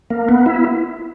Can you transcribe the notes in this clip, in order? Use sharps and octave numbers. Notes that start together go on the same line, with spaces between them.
A#3
B3
E4